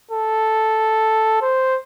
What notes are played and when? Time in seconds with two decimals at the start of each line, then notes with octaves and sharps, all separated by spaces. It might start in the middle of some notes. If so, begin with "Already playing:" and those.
0.11 A4
1.42 C5